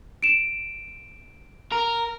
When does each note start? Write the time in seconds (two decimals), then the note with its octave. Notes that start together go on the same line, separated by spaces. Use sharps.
0.23 D7 E7
1.72 A#4